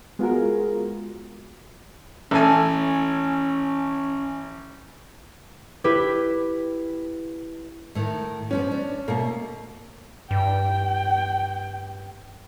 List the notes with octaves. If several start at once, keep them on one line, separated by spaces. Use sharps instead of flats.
G#3 B3 F4 F#4 G#4 A#4
A1 C#4 A4 G#5
E4 G4 B4
A2 D#3
G2 F3 B3 C#4
D4
B2 A3 A#3
G2 G5